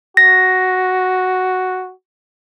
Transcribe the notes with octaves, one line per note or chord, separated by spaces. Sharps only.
F#4 A#6